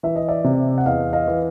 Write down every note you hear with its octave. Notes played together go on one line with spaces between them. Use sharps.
E3 E5
D#5
D5 E5
C3
F#5
E2 D#5 F5
D#5 F5
E3